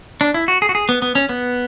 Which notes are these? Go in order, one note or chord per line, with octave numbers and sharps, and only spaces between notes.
D4
E4
F#4
G#4
F#4
G#4
B3
B3
C#4
B3